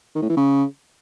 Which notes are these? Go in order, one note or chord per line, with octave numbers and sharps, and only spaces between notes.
D#3
A2
E3
C#3